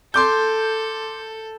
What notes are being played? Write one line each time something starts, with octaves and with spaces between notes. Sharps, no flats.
A4 C6 D6 G6